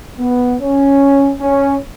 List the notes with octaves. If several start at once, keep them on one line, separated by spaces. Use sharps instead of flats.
B3
C#4
C#4